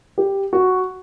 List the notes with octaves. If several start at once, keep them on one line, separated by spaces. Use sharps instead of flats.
G4
F#4